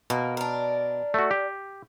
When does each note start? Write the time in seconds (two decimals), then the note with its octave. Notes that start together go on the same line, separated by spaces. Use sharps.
0.10 B2 A#3
0.37 D4 A#4
1.14 A3 F#4
1.31 G4